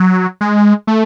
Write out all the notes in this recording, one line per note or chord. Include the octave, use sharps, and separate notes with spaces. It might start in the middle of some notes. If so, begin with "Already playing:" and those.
Already playing: F#3
G#3
A3